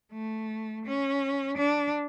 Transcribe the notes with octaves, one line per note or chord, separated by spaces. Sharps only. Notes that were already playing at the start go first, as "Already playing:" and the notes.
A3
C#4
D4